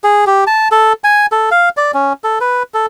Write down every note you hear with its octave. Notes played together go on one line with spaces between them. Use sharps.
G#4
G4
A5
A4
G#5
A4
F5
D5
C#4
A4
B4
A4